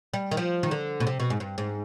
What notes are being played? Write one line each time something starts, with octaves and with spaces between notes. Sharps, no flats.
G3
D#3
F3
D#3
D3
B2
C3
B2
G#2
G2
G#2